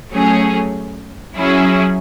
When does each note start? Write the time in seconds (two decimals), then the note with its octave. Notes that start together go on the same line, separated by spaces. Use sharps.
0.11 F#3 A3 C#4 G#4
1.36 F#3 C#4 E4 G#4